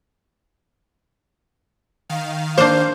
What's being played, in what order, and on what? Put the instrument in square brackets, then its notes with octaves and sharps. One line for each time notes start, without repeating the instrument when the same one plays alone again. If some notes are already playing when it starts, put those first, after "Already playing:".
[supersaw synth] D#3 F5
[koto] A#3 D4 [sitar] C5